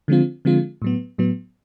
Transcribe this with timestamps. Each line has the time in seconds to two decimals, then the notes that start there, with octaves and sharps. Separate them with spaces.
0.08 D3 F3 G#3 C4 F4
0.45 D3 F3 G#3 C4 F4
0.82 A2 F#3 B3
1.18 A2 F#3 B3